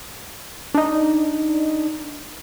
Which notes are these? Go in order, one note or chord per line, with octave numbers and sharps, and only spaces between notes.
D4 D#4